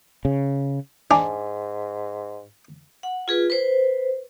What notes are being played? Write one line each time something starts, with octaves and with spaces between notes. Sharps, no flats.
C#3
G#2 D4 G#5
F#5
F4 G#4 B4
B4 C5